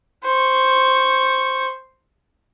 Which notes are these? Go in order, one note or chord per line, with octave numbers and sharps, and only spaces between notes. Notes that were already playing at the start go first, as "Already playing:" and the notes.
C5 C#6